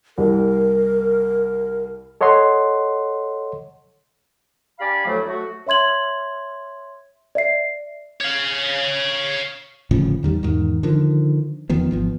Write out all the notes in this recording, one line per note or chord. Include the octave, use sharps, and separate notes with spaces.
C2 G3 A#4
A4 C#5 D#5 F#5 C6
D4 G4 D5 F5 G#5 B5
D2 A2 F3 F#3 A3
A3 F#4
C#5 E5 C6 G#6 F#7
D5 E5 C7
C#5 F5
G1 A2 C#3 F3
E2 D#3 G3
E2 G#2 D#3
D3 D#3 F3
E2 D#3 F3 B3
G#1 F3 B3